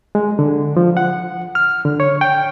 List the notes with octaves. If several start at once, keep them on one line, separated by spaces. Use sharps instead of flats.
G#3
D3
F3
F#5
F6
D3
C#5
G5